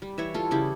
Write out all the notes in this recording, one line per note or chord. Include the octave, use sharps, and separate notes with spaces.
G3
E3 C#5 E5
G3 F4 A4
C#3 E4 G4